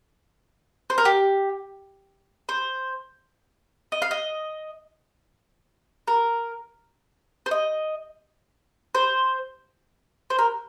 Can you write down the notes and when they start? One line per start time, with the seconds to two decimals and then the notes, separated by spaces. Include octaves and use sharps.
0.90 C5
0.98 A#4
1.05 G4
2.49 C5
3.92 D#5
4.02 F5
4.11 D#5
6.07 A#4
7.46 C5
7.51 D#5
8.95 C5
10.30 C5
10.39 A#4